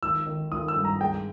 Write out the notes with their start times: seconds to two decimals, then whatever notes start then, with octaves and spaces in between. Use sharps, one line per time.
0.03 G#1 E6
0.27 D#3
0.52 G#1 D#6
0.68 E6
0.76 G2
0.85 A#5
1.01 G#3 G5